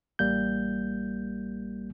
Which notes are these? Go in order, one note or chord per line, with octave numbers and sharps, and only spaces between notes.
A1 G3 A#3 G6